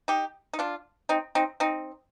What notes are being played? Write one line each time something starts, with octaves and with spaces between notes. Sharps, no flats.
D#4 G4
D#4
D4 F4
C4 D#4
C4 D#4
C4 D#4